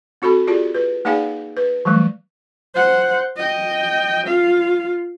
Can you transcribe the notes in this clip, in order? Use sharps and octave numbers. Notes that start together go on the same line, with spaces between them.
C4 F#4 A4 B5
F4 G4 G#4 D5
B4
A#3 D#4 G#4 D5 F5 G#5
B4
E3 F#3 G3 A3
C5 F#5
D#5 G5
F4 F5